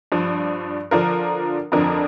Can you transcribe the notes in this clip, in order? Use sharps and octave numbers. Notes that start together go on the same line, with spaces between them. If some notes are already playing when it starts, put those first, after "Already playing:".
G2 F3 D4
D3 F3 D4 F4 A#4
F2 D3 F3 D4 A#4